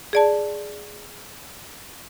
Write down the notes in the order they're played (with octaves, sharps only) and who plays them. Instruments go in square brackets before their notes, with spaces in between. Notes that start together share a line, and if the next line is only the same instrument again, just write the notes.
[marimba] G#4 D5 A5